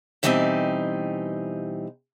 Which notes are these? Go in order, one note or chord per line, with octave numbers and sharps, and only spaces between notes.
B2 E3 G3 B3 C4 D#4